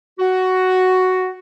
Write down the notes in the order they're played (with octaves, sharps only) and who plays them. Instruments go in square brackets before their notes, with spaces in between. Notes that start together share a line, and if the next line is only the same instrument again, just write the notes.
[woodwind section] F#4